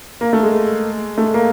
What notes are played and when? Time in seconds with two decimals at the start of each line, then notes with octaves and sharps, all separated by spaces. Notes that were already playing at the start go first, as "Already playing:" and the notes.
0.21 A#3
0.33 A3
0.43 G#3
1.18 A3
1.34 A#3